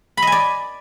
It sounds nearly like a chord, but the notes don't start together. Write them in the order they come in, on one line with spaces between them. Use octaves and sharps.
B5 D#5 G#5 D5